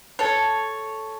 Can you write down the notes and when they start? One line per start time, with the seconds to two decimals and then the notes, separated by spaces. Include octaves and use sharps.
0.19 A4 C#5